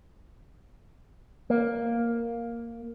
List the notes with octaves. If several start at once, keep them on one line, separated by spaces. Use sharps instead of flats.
A#3